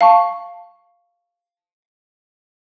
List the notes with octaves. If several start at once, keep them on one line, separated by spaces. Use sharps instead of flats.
F5 A5 C#6